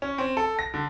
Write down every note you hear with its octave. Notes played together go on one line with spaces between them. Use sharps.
C#4
C4
A4
A#6
D3